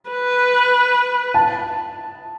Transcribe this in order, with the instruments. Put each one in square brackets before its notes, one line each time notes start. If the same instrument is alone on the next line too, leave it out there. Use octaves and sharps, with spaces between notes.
[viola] B4
[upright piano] A5